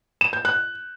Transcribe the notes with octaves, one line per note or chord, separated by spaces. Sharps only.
E7
G6
F#6